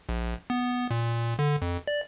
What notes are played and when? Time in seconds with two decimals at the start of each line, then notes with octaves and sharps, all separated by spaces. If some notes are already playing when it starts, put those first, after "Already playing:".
0.09 A#1
0.50 B3
0.91 A#2
1.39 D3
1.62 F2
1.88 D5